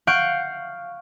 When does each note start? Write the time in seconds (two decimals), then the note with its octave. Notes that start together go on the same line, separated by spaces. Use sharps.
0.07 F5 F#5 C#6 G6 D7